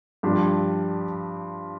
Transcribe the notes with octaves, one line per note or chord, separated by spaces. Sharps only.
G2 F3 D4 G4